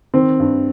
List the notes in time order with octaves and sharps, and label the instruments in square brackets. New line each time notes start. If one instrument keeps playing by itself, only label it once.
[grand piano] D#3 [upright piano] C4
[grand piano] G2